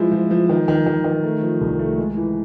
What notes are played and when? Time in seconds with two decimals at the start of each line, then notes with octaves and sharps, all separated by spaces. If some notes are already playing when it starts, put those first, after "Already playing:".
Already playing: F3 G#3 E4
0.12 F3
0.31 F3
0.49 D#3
0.68 D#3
0.86 D#3
1.04 D#3
1.23 A3
1.42 F3
1.61 C2
1.79 A3
1.98 G#3
2.17 E3